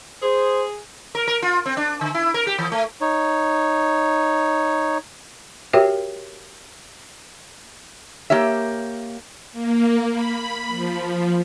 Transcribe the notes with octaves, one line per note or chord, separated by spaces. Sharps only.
G#4 C5
A#4
A#4
F4
C4
D4
D3
E4
A#4
G4
E3
A3
D#4 C#5
F#4 G4 A#4 C#5 E5 G5
A#3 G4 C#5 E5
A#3
B5
F3